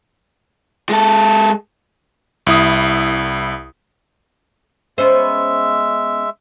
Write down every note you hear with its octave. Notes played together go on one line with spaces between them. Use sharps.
G#3 A4
C2 E4 D#6
G#3 B3 C#4 C5 E5